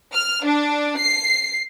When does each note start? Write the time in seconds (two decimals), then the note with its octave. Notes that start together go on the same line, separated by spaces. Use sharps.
0.13 F6
0.45 D4
0.98 C7